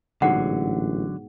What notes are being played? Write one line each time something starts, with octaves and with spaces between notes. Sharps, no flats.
A1 G#2 B2 D3 F#3 F#5